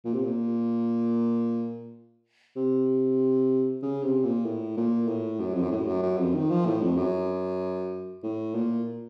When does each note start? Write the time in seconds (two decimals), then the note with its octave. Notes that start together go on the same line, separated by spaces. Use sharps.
0.05 A#2
0.14 C3
0.24 A#2
2.56 C3
3.83 C#3
4.04 C3
4.25 A#2
4.46 A2
4.77 A#2
5.08 A2
5.40 F#2
5.54 F2
5.63 F#2
5.72 A2
5.87 F#2
6.03 F#2
6.18 F2
6.34 D#3
6.50 F3
6.67 A2
6.82 F2
6.97 F#2
8.24 A2
8.55 A#2